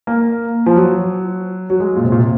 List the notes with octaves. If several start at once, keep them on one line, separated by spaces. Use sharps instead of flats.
A#3
F3
F#3
F#3
G#3
A#2
C3
A#2
C3